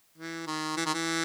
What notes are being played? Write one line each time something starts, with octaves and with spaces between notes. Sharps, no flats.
E3
D#3
E3
D#3
E3